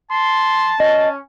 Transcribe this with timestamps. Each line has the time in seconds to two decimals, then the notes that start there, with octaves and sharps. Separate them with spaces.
0.11 A5 C6
0.80 C#4 D#5